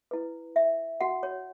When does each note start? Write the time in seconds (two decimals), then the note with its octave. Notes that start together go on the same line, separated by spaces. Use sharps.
0.11 E4 B4
0.56 E5
1.01 F#4 F#5
1.23 C#5